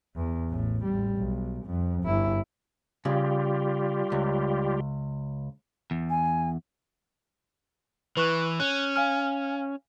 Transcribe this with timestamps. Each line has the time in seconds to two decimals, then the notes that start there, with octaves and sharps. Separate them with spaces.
0.16 E2
0.50 A1 A2
0.85 A1 G3
1.18 B1
1.66 F2
2.04 G1 E4
3.05 C#3 G3 F4 G4
4.12 C#2
5.91 E2
6.10 G#5
8.17 E3 B4 C#6 F#6
8.60 C#4 F#6
8.96 F5 G#5 F6